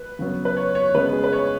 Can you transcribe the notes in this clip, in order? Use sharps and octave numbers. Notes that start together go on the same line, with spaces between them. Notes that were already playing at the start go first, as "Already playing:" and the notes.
Already playing: B4
C#3 F#3 B3
B4
C#5
C#5
C#3 G#3 B3 B4
G#4
B4
C#5